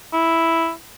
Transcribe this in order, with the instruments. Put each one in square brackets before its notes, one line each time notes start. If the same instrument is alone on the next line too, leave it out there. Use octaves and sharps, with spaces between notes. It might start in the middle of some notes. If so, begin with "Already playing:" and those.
[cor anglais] E4